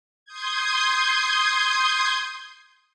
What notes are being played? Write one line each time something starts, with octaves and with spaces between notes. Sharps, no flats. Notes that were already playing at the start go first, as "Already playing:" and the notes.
C6 D#6 G6 G#6